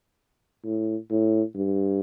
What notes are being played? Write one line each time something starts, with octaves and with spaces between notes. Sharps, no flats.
A2
A2
G2